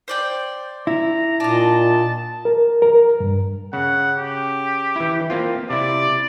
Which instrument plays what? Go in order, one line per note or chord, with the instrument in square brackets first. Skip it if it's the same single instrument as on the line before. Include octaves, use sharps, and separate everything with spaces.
[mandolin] C5 D5 G5
[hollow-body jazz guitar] E4 [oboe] A#5
[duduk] A#2 [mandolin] D4 D#5 [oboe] A5
[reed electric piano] A#4
A#4
G2
[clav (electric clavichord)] C#3 [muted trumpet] F#5
[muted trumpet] G4
[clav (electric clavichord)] E3 E4
A#3 C4 F4
[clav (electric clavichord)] C3 E4 [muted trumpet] D5